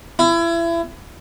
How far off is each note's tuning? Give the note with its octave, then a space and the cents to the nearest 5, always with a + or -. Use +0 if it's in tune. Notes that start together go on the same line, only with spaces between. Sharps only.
E4 +30